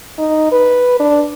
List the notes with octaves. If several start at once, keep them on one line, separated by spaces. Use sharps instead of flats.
D#4
B4
D4